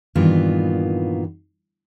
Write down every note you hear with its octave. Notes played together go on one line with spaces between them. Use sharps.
G2 A#2 D#3 E3 B3 F4